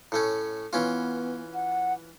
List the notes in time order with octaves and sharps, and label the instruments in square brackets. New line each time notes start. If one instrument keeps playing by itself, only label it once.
[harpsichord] A2 A3 C#4
[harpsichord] E3 C#4 F4 [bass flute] B3
[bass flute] F#5